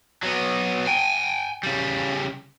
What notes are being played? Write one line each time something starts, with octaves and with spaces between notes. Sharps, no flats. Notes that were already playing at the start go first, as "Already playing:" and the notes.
F#3 B3
G5 G#5
C#3 G3